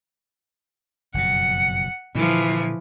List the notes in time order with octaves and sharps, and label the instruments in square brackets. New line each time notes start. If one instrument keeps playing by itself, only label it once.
[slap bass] F#1 F2 B2 [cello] F#5
[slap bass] A#2 D3 [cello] E3 F3